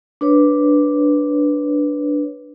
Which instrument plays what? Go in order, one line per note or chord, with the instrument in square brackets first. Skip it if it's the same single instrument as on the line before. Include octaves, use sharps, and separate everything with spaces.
[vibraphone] D4 B4 C#5